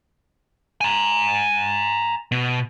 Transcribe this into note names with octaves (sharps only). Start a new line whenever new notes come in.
G#5 A#5
B2